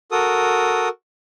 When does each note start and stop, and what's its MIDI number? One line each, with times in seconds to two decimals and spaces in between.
0.12 0.89 66
0.12 0.89 69
0.12 0.89 70
0.12 0.89 87